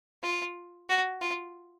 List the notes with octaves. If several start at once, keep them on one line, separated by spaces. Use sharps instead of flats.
F4
F#4
F4